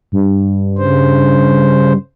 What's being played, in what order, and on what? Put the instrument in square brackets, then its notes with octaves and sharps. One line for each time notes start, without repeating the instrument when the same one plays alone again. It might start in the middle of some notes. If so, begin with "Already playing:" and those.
[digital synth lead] G2
[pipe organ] C#3 C5